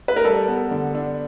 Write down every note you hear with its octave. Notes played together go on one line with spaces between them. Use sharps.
B4
A#4
G3 A4
B3
D3
D4